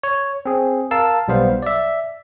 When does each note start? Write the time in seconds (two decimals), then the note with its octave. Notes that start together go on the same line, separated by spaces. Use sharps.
0.03 C#5
0.46 C4 G#4
0.91 A#4 F5 A5 E6
1.28 B1 G3 B3 C5 F5
1.62 D5 E5